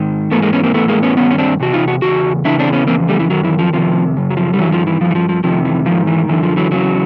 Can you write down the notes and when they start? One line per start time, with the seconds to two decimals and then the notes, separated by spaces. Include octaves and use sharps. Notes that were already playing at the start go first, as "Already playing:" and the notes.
Already playing: G#2 D#3
0.31 G#2 E3 A3 B3
0.42 G#3 A#3
0.53 B3 C#4
0.63 A#3 C4
0.74 A2 E3 A3 B3
0.88 G#3 A#3
1.03 B3 C#4
1.16 G2 D#3 B3 C#4
1.31 C#4
1.38 C4 D4
1.60 E2 C3 F#4
1.73 D#4 F4
1.88 F#4
2.02 E2 C#3 F#4
2.45 E2 C#3 E3 D4 E4
2.59 C4 D4
2.73 B3 C#4
2.87 F2 C#3 E3 A#3 C4
3.09 G3 A3
3.19 E3
3.30 F#2 D#3 F#3
3.44 E3
3.59 F3
3.73 F2 C3 D#3 F3
4.17 F#2 C#3
4.31 F#3
4.37 F3
4.54 G3
4.58 G2 D#3 E3 F#3
4.72 F3
4.87 E3
5.01 G2 E3 F3
5.11 E3
5.15 F3
5.29 F3
5.44 F2 C3 D#3 F3
5.65 E3
5.86 G#2 D#3 F3
6.07 E3
6.29 F#2 D3 E3
6.43 F3
6.57 E3 F#3
6.71 E2 C#3 E3 F#3